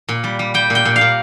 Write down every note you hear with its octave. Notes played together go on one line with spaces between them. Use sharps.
A#2
G3
G3
G3 G5
A#2 G5
A#2
F5
A#2